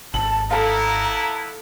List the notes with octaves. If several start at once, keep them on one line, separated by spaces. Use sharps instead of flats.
G#1 A5 F#7
A#3 B3 E4 A4 F5 A#5